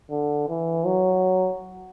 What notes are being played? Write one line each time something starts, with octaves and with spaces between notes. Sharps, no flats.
D3
E3
F#3